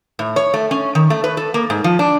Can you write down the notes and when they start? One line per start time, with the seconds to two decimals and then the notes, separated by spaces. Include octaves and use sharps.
0.19 A2
0.36 C#5
0.54 A3
0.71 C#4
0.95 D#3
1.10 A3
1.24 B4
1.37 A4
1.54 A#3
1.70 G#2
1.84 F3
1.99 D4